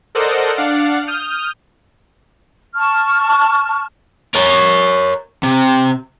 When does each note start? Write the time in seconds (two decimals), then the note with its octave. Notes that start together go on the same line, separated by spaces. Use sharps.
0.15 A4 A#4 C5 D5 D#5 F#5
0.57 D4 D5 F5 F#5
1.07 D#6 F6 G6
2.75 A5 C#6 F6
4.35 A#4 C#5
5.43 C3